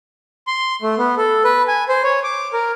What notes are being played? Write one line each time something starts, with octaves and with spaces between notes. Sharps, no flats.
C6
A3
B3
A4
B4
G#5
C5
C#5
D6
A#4